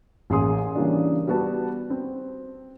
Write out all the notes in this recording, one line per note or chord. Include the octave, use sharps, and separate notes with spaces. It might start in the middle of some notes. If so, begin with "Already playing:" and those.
A1 A#3 G#4 A#4 C6 D#6
C#3 E3 G3 A#3 D4
G3 B3 F#4 B4 A5
C4